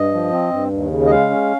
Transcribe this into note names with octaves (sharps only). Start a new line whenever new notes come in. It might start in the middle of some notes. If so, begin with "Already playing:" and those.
Already playing: G2 D#5
F3
C4
G2
D#2
C#3
D#5
G#3 F5
C#4